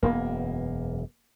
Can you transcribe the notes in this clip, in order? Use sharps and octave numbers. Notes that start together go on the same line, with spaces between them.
E1 F#2 A#3 B3